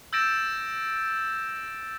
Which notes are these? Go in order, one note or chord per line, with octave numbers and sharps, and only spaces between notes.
E6 G6 A6 A#6 D7 E7